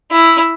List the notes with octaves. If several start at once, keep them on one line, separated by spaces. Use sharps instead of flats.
E4